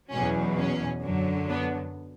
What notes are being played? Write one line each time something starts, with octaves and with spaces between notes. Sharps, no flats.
E2 B2 F#3 C#4
C#4
F#2 D3 F#3
B3 D4